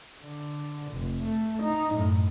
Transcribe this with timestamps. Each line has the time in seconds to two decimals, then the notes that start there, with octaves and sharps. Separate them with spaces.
0.22 D3
0.92 F1
1.23 A3
1.62 D#4
1.93 F#2 A2